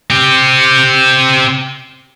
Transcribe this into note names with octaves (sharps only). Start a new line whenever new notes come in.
C4 G4